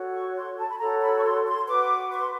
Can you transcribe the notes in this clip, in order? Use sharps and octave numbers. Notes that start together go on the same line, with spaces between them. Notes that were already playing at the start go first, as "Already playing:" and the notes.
Already playing: F#4 A4 C#5
C#6
C6
A5
B5
F#4 A4 C#5 A#5
B5
C#6
C6
C6
F#4 B4 D6
C#6
C6